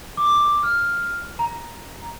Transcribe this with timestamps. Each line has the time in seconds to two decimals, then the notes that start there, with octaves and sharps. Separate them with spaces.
0.17 D6
0.63 F6
1.39 A#5